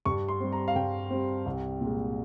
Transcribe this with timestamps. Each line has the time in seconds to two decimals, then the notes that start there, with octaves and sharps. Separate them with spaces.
0.05 G2 C#6
0.28 C6
0.40 G3 C4
0.52 A#5
0.68 F5
0.76 G2 G5
1.11 G3 C4
1.46 C2
1.81 A#2 G#3